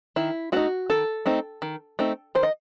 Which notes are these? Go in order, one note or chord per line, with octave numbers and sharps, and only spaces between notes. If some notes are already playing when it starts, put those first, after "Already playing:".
D#3 E4
A3 C4 D#4 F#4
D#3 A4
A3 C4 D#4
D#3
A3 C4 D#4
D#3 C5
D#5